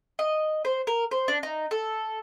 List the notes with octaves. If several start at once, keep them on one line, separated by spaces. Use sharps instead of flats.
D#5
C5
A#4
C5
D4
D#4
A4